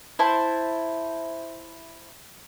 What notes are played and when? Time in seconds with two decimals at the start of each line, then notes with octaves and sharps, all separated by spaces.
0.19 E4 C5 A5